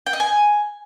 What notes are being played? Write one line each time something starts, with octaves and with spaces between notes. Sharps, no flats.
G5
D#5
G#5